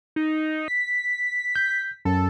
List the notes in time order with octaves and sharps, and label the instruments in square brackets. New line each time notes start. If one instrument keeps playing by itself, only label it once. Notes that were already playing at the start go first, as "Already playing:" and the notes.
[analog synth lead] D#4
B6
[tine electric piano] G6
[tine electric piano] F#2 [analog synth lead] A4